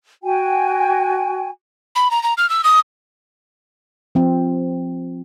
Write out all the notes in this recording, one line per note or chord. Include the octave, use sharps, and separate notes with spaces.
F#4 G5 G#5
B5
A#5
A#5
F6
E6
D#6
F3 C4